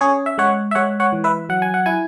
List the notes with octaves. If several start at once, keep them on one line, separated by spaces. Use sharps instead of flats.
C#4 G#4 C#5
E5
G#3 C#5 F#5
E5
G#3 C#5 F#5
C#5 F#5
E3
B4 E5
F#3 F#5
G#5
F#5
E4 G#5